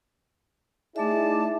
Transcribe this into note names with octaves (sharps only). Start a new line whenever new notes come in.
A3 D#4 E4 G#4 D5 E5 A5